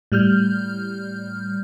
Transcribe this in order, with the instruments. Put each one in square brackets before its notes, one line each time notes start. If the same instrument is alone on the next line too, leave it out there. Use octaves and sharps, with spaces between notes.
[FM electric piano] A2 G3 F6 G6